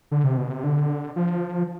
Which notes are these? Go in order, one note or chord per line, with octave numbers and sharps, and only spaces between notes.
D3
C3
B2
C3
D3
F3